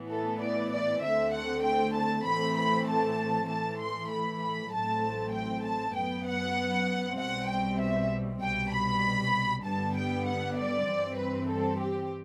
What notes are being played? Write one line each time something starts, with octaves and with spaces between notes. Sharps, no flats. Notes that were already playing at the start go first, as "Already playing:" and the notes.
Already playing: A2 E3 B3
A4
D5
D5
D2 D3 A3 C4 E5
F#5
G5
A5
A2 E3 A3 C4 B5
B5
A5
A2 E3 A3 A5
C6
B5
B5
A1 A2 F#3 A3 C4 A5
G5
A5
F#2 F#3 B3 G5
F#5
B1 B2 G3 C4 F#5
G5
E5
C2 B2 G3 G5
B5
G2 D3 G3 B3 A5
G5
F#5
D5
G2 E3 G3 C4
B4
A4
G4